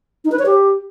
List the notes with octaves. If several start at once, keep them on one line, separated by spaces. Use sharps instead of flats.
D#4
B4
C#5
G4